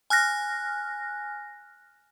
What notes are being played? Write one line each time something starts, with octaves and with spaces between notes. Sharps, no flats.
G#5 F6 F#6 A#6